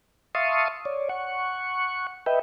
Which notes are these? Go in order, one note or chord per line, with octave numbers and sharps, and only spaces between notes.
E5 F5 A5 C6 C#6 D#6
C#5 D5
F#5 C#6
B4 D#5 E5 G5